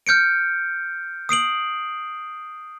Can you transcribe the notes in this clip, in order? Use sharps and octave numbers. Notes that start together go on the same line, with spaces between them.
F6 G6 C#7 D7
D#6 C7 D7 F#7